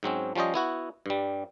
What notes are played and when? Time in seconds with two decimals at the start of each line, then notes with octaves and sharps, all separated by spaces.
0.03 G#2 F#3 C4 C#4
0.35 F3 G3 C#4 C5 D#5
0.54 B3 E4 F#4
1.06 G2 G3